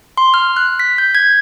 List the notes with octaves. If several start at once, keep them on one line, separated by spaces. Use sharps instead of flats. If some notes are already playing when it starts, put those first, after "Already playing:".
C6
F6
F#6
B6
G6
G#6